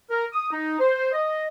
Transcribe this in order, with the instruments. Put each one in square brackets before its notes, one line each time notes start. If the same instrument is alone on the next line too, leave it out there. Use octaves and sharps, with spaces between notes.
[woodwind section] A#4
D#6
D#4
C5
D#5